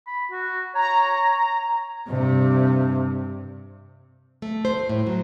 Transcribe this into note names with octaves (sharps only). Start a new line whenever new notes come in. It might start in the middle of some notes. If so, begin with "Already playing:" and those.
B5
F#4
C#5 A#5
G2 C3
A3
C5
A2
F#3